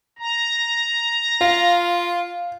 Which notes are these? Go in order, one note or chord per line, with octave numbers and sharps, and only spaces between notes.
A#5
F4 F5